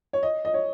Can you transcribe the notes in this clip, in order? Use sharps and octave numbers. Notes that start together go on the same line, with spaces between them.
C#5
D#5
D#5
C#5